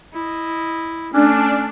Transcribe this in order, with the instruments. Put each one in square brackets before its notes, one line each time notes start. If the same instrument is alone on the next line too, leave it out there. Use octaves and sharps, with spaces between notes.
[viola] E4 D#5
[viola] A3 [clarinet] C#4 [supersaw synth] D4